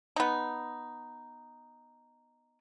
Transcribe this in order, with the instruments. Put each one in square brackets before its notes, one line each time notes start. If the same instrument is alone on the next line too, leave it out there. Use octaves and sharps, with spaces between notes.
[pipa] B3 D#4